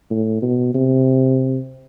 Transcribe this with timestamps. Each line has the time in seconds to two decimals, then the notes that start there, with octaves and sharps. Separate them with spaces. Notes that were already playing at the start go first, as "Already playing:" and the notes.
0.11 A2
0.42 B2
0.74 C3